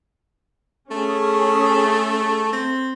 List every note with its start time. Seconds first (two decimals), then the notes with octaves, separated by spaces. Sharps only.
0.91 A3 C#4 G#4
2.53 C4